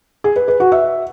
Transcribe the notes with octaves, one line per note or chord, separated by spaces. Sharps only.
G#4
B4
B4
F#4
E5